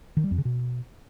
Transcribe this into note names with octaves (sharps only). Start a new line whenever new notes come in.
D#3
G3
F2
C#3
B2